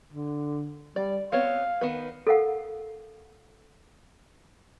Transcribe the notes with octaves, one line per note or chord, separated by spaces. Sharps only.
D3
G3 D5
B3 C4 C#5 F5
D#3 B3 B4
A4 A#4 F5 F#5